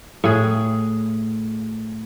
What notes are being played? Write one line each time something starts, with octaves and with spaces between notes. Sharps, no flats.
A2 G#4